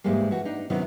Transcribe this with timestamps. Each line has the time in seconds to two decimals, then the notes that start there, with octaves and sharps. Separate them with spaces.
0.04 G#2 E3 G3 G#3 A#3
0.31 E3 F#4
0.45 D4 D#4
0.70 C3 D#3 F#3 B3 C#4 E4